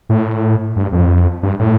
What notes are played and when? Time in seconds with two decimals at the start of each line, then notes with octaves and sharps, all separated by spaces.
0.09 A2
0.76 G2
0.92 F2
1.43 G2
1.59 A2